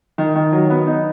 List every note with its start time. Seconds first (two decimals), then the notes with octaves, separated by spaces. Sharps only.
0.18 D#3
0.36 D#3
0.52 F#3
0.70 B3
0.87 D#4